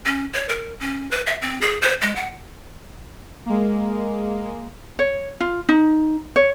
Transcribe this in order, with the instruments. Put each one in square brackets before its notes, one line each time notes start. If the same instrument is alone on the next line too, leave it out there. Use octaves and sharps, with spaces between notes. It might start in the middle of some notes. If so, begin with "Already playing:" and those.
[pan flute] C#4
C#5
A#4
C#4
B4
E5
C4
G#4
C5
G#3
F#5
[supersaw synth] G#3 A#3
[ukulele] C#5
F4
D#4
C#5